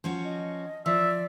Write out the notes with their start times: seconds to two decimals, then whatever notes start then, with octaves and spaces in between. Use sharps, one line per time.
0.04 F3 C#4 F#4
0.24 D#5
0.86 F3 D5 E5